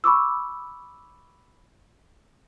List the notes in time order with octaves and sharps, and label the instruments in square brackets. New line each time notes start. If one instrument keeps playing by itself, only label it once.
[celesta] B5 C#6 D6 E6